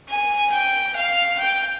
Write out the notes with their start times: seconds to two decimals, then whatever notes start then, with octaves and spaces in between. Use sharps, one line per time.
0.08 G#5
0.51 G5
0.96 F5
1.39 G5